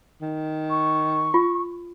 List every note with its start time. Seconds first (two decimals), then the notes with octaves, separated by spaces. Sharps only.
0.22 D#3
0.70 C#6
1.34 F4